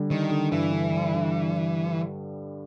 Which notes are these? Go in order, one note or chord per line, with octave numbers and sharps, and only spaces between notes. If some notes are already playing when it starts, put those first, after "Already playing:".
Already playing: D3 G3
D#3 G3
D3
G2 E3
D3
G3
D3